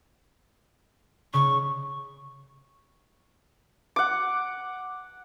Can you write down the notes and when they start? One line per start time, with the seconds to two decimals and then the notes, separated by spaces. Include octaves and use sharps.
1.33 C#3 C#6
3.96 F#5 D6